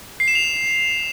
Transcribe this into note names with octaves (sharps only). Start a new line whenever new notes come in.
C7
E7
F7